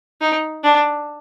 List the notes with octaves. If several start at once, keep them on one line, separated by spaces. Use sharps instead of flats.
D#4
D4